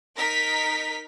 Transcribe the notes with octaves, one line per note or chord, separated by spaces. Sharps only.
D#4 A#4 B6